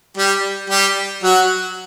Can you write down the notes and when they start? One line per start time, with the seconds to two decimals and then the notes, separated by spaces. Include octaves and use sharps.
0.17 G3 G4
0.70 G3 G4
1.23 F#3 F#4